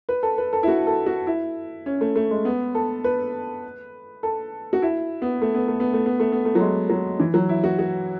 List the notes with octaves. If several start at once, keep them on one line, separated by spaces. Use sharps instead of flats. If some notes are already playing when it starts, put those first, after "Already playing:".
B4
A4
B4
A4
E4
F#4
A4
F#4
E4
C#4
A3
A3
G#3
B3
A4
B4
A4
F#4
E4
B3
A3
B3
A3
B3
A3
B3
A3
B3
A3
F#3
G#3
F#3
E3
F#3
E4
F#4
F#4